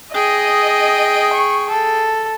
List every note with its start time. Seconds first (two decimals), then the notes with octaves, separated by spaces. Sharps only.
0.14 G#4 D#5 G5
1.33 C#6
1.71 A4